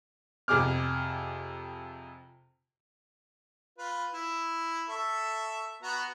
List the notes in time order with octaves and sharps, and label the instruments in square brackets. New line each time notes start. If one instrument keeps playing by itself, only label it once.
[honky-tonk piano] F2 C3 G#4 D6 F6
[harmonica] F4 B4
E4
A4 E5 C#6
B3 F#4 A#5